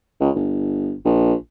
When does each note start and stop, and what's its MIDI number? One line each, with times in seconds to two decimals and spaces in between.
0.20 0.30 37
0.35 0.94 31
1.05 1.33 34